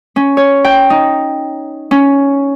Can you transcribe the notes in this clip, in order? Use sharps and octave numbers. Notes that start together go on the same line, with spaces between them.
C#4
C#5
G5
D#4
C#4